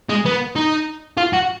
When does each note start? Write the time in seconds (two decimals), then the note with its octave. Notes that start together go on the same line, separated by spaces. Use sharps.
0.09 G#3
0.25 B3
0.56 D#4
1.18 F4
1.33 F#4